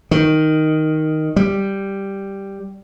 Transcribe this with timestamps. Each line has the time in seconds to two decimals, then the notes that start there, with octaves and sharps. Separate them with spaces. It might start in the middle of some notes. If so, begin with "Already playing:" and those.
0.11 D#3
1.36 G3